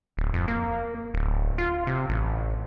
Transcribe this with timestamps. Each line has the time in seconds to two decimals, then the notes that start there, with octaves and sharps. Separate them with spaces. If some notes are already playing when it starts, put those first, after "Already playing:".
0.17 D1
0.34 F2
0.48 A#3
1.14 D1
1.58 F4
1.87 C3
2.09 A1